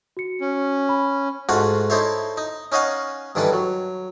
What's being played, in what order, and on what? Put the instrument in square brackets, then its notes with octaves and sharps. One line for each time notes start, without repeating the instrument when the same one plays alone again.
[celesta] F#4 C#7
[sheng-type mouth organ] C#4
[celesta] B5
[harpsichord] G#2 A3 F4 F#4 F#5
D#4 E4 A4 C5 C#5 E5
D#4
C#4 D#4 C#5 D#5 F5 F#5
G2 D#3 E3 A4 B4
F#3